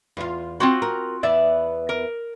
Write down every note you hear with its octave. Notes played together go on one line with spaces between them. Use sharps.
E2 F4
C4 F4 F#4 C5
A#4
E2 B3 D5 E5
A#4